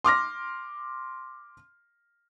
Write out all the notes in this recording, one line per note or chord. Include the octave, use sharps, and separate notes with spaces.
C6 D6 F6 A#6